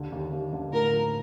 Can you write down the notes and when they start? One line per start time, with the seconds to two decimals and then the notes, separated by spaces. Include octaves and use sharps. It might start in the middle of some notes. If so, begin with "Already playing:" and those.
Already playing: D#2 D3
0.12 D#2
0.32 D#2
0.53 D3
0.73 A2 A#4
0.93 F3